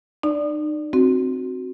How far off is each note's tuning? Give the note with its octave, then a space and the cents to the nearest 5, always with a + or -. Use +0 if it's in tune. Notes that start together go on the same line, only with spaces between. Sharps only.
D#4 -35 D5 +0
C4 +0 F#4 +0